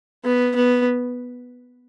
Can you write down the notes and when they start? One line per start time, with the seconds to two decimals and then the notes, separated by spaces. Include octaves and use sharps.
0.24 B3
0.56 B3